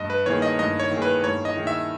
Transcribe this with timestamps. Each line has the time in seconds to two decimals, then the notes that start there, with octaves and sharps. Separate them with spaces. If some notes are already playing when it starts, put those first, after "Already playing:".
Already playing: G2 D#5
0.10 B4
0.26 D#3 A#3 E4 G#4 C#5
0.42 D#5
0.59 G2 D#5
0.80 C#5
0.91 D#3 A#3 E4 G#4
1.02 B4
1.24 G2 C#5
1.45 D#5
1.55 D#3 A#3 E4 G#4
1.67 E5